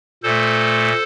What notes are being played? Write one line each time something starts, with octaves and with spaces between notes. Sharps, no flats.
A#2 A3 A4 C5